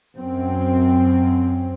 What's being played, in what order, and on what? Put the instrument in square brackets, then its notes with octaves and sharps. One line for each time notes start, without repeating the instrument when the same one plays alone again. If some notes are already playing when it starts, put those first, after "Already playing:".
[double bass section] F#2 C4